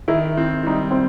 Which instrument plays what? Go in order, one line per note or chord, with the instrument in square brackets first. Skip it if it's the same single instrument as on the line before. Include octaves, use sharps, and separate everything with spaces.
[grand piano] D#3 [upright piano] E4
[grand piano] C4 [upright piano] E4
[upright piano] E4
[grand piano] G3 [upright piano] D#4
[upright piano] C4